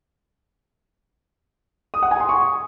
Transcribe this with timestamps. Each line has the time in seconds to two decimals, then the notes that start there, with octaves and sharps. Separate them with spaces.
1.94 D#6
2.02 F#5
2.11 G#5
2.20 C6
2.29 C#6